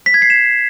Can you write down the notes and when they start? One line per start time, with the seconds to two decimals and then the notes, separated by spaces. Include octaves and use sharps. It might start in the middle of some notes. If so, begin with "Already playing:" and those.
0.06 B6
0.14 G#6
0.22 C7
0.30 E7